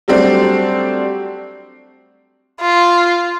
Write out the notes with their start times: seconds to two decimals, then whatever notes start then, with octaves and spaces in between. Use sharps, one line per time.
0.08 F#3 G3 A3 C4 D4
2.61 F4